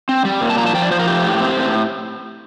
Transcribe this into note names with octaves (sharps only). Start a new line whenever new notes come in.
C4
G3
A#2
A5
F3 A#5
A5
F3 G5
D5
F3 C5
A#4
A3 G4
A2
C4
A2